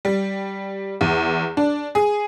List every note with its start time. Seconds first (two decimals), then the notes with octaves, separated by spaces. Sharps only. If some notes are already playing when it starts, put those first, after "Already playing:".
0.05 G3
1.01 E2
1.57 D4
1.95 G#4